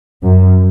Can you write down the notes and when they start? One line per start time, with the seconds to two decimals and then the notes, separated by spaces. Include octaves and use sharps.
0.23 F#2